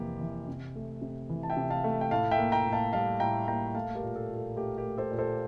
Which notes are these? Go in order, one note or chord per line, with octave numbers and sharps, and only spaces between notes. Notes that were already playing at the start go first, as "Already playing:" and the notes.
Already playing: F2 C3 E3 A#3 G4
E3
C3
A3
C3
E3
A5
E5 G5
C3
F5 A5
A3
G5
A2 F5 A5
E5 G5
A#3
G5 A#5
A2
F5 A5
G3 F5 A5
A2 G5 A#5
A#3 G5 A#5
A3 F5 A5
G4 A#4
A#2
A4
A#2
A4
A3 G4 A#4
G4 A#4
A3
A4 C5
A#2
A4 C5